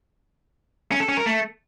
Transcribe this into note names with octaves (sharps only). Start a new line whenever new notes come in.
C#4
A4
C#4
A#4
A3